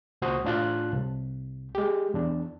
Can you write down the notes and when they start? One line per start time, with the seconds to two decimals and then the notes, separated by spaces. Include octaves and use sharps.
0.22 C#2 A#2 F#4 C5 D#6
0.45 A2 D4 F4 A5 F#6
0.93 C2
1.75 G#3 G4
2.14 E2 D4